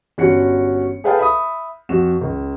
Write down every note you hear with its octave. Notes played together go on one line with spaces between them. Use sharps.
G1 C#4 F#4 F#5 C#7
G#4 A4 B4 F5 G5 A5
E5 B5 D#6
F2 F#4 E7
C#2